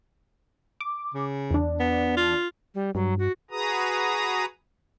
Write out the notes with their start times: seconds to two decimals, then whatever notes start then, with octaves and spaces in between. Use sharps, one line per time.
0.81 D6
1.14 C#3
1.51 E2 D4
1.80 B3
2.17 F4
2.75 G3
2.95 G2 F#3
3.19 F#4
3.51 F#4 G#4 B4 A#5 D#6